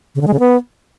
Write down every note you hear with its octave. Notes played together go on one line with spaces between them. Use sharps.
C#3
D3
G#3
C#3
B3